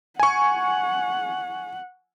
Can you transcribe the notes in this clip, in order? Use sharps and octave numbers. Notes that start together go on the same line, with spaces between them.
F#5 G#5 C#6